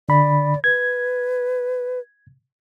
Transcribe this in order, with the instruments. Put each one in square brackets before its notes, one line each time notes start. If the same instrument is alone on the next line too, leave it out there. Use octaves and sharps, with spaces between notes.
[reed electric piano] D3 B5 [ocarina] D5
[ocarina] B4 [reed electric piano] G#6